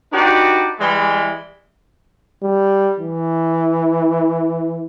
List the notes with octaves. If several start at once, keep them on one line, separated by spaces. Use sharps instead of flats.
D4 D#4 F#4 G4 B4 D5
E3 G3 G#3
G3
E3